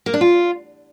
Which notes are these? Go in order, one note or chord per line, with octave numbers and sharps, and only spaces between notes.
A#3
D4
F4